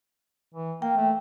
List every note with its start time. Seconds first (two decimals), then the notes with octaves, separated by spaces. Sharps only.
0.54 E3
0.82 A#3 G5
0.97 A3